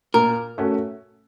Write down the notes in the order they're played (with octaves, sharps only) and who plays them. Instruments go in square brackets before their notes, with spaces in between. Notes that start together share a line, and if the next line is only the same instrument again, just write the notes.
[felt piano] A#2 [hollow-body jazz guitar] A#4
[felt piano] A3 C#4 F#4